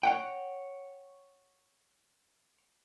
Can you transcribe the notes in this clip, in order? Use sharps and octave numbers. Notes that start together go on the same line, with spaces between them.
C#5 F#5 G5